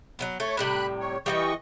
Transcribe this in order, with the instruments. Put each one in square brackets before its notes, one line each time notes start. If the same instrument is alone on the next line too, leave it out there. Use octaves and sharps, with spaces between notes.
[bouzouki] F#3 G3 B3
[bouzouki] A3 [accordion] C#5
[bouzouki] A2 C3 G3 [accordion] B5 F#6
[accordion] C#5
[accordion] E3 D#5 C#6 [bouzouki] G3 F5 G5